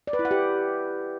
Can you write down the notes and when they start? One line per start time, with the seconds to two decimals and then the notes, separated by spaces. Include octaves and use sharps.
0.07 D5
0.13 B4
0.19 E4
0.25 F#5
0.31 G4